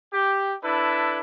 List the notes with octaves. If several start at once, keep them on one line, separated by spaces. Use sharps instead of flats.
G4
D4 E4 A4 B4